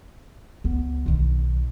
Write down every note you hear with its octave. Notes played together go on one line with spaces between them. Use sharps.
C#2 B3
B1 D#3